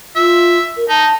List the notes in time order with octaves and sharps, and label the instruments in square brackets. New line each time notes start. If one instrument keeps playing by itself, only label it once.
[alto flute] F4 [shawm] E5
[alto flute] A#4
[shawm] D#4 [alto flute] A5